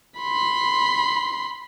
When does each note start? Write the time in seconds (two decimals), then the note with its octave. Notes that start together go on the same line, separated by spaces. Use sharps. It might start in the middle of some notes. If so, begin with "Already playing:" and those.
0.19 B5 C6